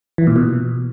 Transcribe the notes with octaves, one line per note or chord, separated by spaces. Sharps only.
E3
A#2
B2